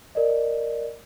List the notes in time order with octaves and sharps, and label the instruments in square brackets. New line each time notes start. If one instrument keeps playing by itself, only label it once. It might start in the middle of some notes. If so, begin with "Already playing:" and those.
[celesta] A#4 D5 D#5